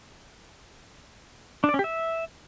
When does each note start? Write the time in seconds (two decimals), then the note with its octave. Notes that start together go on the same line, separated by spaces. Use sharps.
1.64 D4
1.69 D5
1.74 C#4
1.79 G4
1.84 E5